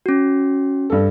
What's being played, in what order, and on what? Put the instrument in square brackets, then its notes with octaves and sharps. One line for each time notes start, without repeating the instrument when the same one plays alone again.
[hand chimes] C#4 F#4
[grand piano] G2 A4